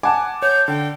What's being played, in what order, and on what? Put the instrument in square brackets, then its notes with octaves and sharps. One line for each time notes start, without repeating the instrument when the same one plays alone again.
[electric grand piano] F#5 G#5 [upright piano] A5 D6
[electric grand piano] C#5 [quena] G6
[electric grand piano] D3 [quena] G5